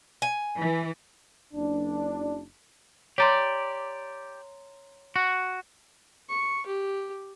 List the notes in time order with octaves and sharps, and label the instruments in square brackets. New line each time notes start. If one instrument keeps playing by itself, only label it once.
[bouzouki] G#5
[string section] E3
[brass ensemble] F#1 D4
[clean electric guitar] G4 D5 [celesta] C#5 A#5 C6
[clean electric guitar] F#4
[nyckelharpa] C#6
G4